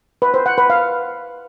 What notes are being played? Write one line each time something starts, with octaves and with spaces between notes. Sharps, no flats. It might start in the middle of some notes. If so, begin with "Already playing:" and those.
B4
C5
F#5
B4
F5